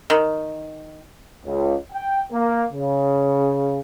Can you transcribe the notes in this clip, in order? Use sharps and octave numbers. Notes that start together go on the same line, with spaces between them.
D#3
C#2
G5
A#3
C#3